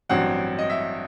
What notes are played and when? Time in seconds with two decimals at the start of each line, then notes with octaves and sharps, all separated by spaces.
0.09 A1 G2 F#3 C4 F#5
0.59 D#5
0.70 E5